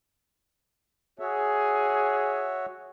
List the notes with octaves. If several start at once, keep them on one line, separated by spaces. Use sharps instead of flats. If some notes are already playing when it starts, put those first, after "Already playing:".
F#4 G#4 C#5 E5